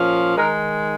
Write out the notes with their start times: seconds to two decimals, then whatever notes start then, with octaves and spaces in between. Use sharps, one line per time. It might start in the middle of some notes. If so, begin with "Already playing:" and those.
Already playing: A#2 F3 C#4 F4
0.38 D#3 G#3 D#4 A#4